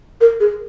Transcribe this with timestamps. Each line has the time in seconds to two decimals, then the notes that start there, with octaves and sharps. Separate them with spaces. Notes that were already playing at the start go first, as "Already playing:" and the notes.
0.21 A#4
0.40 G#4